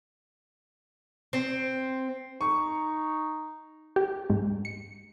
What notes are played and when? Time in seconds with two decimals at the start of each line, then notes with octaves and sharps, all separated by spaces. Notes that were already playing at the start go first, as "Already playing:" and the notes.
1.33 C4
2.41 D#4 C#6
3.96 G4
4.30 G#2
4.65 C#7